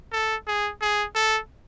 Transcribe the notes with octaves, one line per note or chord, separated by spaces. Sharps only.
A4
G#4
G#4
A4